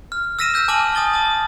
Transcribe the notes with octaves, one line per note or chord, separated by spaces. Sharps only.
F6
E6 F6 A#6 B6 D#7 E7
E6 G6 A#6 E7
G#5 A5 D6 F6 D#7 F#7
G#5 D#6 A6 G7
A5 D#6